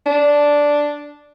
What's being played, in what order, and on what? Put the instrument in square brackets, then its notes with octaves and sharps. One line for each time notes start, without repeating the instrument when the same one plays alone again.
[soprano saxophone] D4